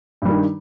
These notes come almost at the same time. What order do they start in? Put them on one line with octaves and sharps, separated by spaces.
G2 G3 D#3